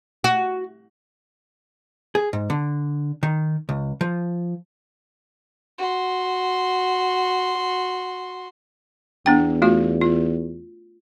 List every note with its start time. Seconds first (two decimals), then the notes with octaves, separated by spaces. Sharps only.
0.24 F#4
2.15 G#4
2.33 G#2
2.50 D3
3.23 D#3
3.69 C#2
4.01 F3
5.78 F#4 C6
9.26 E2 B3 D4 G5
9.62 A3 F4 F#4
10.01 F4